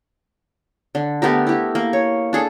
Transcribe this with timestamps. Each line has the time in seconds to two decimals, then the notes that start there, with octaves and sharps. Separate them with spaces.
0.95 D3
1.22 A3 B3 G4 A#4
1.47 E4 G4
1.75 A#3
1.93 C#5
2.33 D4 G#4 A4